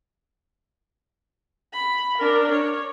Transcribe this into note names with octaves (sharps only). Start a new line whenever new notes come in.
B5
D4 A#4
C#5